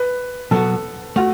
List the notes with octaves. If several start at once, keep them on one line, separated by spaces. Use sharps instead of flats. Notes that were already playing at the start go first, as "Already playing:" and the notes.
Already playing: B4
B2 F#3 B3 F#4 A4
A3 F4 F#4